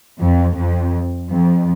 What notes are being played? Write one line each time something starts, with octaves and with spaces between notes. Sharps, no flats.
F2
F2
F2